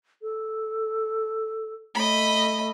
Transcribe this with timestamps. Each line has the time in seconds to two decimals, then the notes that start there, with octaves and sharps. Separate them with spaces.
0.22 A4
1.95 A3 D#5 B5